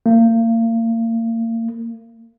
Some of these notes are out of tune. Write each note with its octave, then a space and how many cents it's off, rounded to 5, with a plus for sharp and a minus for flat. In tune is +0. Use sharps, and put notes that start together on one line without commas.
A#3 -35